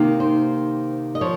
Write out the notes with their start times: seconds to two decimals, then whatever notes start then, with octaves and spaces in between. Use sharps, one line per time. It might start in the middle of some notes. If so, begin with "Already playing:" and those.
Already playing: C3 D#3 A#3
0.20 C5
1.15 D#5
1.21 F3 C#5